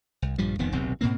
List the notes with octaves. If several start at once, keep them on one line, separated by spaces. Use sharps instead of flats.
C2
A#1 G2 F3 G3
D#1 F2 D#3 B3
D#1 B1 C3 C4
G#2 B2 A#3 C4